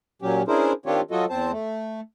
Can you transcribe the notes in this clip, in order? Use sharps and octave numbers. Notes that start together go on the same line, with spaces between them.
A#2 F#3 C#4 G4
C#4 D4 E4 G#4 A#4 C5
D#3 C4 D4 F4 G4 C#5
F#3 F4 F#4 A4 D#5
E2 C4 C5 A5
A3